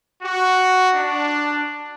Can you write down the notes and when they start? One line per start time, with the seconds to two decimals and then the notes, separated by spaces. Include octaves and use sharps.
0.21 F#4
0.94 D4